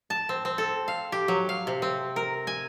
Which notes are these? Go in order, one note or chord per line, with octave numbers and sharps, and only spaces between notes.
A5
C4
C4
A4
F5
G4
F#3
F5
C3
C4
A#4
G#5